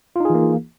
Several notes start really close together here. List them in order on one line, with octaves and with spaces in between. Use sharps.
F4 D#4 G#4 E3 A#3